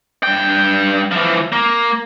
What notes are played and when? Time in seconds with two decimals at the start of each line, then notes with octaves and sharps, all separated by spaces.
0.23 G2 G5
1.11 E3 F3
1.52 A#3